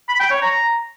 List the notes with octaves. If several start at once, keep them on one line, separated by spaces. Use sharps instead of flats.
B5
G5
C#5
A#5